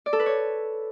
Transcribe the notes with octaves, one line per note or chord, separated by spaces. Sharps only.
D5
A4
B4
C#5